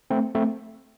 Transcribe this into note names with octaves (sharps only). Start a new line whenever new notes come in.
A3 C4
A3 C4